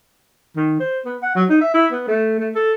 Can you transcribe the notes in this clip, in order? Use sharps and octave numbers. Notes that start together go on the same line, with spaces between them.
D#3
C5
B3
F#5
F#3
D#4
E5
E4
B3
A3
A3
A4